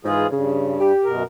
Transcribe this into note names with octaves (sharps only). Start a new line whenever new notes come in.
G#2 E3 F4 G#4
G2 C#3
G4
F#2 B2 A#4